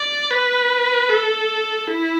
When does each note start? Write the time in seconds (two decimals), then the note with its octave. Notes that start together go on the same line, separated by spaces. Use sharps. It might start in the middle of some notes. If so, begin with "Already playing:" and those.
Already playing: D5
0.31 B4
1.09 A4
1.88 E4